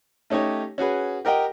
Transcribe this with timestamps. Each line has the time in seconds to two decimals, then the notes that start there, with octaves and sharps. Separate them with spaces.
0.30 A3 C#4 D#4 G4 C#5
0.78 C#4 F#4 G#4 B4
1.25 G4 A#4 D#5 F#5 G5